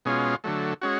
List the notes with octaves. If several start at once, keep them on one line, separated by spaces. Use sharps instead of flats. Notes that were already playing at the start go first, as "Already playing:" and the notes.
B2 G#3 C#4 F4
D3 F#3 A3
G#3 C#4 F#4